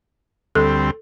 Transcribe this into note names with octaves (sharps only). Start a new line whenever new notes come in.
D2 G3 C4 A4